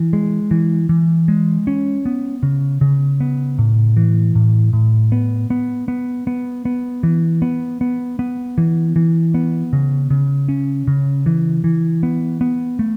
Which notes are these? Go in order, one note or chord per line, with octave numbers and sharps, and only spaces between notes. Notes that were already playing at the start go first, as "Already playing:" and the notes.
Already playing: E3
G#3
E3
E3
G#3
C#4
B3
C#3
C#3
B3
A2
E3
A2
A2
B3
B3
B3
B3
B3
E3
B3
B3
B3
E3
E3
B3
C#3
C#3
C#4
C#3
E3
E3
B3
B3
A3